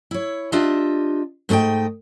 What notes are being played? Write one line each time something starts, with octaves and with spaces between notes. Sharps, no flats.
E4 C#5
D4 F4 G4 D#5 E5
G#2 A3 G4 D#5 G5